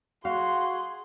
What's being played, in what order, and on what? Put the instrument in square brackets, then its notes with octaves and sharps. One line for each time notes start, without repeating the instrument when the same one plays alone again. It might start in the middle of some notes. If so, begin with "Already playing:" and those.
[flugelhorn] F#4 [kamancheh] G#4 C6 [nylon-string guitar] F5